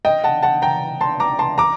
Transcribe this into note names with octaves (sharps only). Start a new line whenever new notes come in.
D#5 G5
F#5 A5
F#5 A5
G5 A#5
A5 C6
A#5 D6
A5 C6
A#5 D6